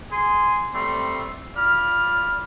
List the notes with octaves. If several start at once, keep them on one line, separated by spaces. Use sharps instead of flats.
G#4 G#5 C6
G3 A3 C4 C6
F4 D5 B5 F6